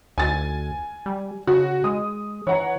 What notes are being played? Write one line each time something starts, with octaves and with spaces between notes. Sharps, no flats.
D2 G#5 A6
G3
C#3 F#4
G#3 D#6
E3 C#5 F#5 A#5